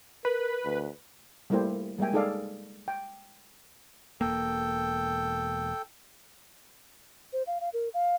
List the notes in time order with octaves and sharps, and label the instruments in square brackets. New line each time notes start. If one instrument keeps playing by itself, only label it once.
[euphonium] A#4 [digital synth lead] B4
[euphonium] D2
[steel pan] G3 A3 A#3 E4 G4 C5
G3 G#3 A#3 E5 G5 G#5
G#3 D#4 G#4 A4 D5 F5
G5
[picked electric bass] E1 A#3 [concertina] A4 G5
[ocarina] C5
F5
F5
A#4
F5